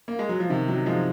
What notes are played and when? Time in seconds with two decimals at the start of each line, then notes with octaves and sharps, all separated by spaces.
0.08 A#3
0.19 G#3
0.29 F#3
0.40 F3
0.50 C3 D#3
0.68 D#3 F#3
0.86 F3 G#3